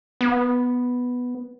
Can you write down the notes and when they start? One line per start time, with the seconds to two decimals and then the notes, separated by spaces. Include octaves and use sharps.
0.21 B3